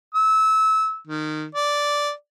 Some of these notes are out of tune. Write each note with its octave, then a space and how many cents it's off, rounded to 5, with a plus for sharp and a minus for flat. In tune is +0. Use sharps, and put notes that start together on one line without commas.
E6 -25
D#3 -20
D5 -5